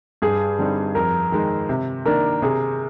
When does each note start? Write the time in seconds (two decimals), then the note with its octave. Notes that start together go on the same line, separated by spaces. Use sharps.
0.22 G2 G#4
0.59 D3 G3 C4 D#4
0.95 F2 A#4
1.32 D#3 G#3
1.69 C3
2.05 D#3 A#3 D4 A#4
2.42 C3 G#4